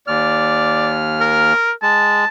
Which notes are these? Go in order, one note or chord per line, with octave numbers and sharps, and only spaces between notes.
D#2 D5 F6
A#4
G#3 A5